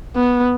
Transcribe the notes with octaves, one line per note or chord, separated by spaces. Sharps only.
B3